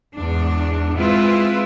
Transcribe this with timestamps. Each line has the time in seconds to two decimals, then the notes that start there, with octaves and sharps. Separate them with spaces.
0.15 E2 G#2 D4
0.96 G#3 C4 E4 F4 B4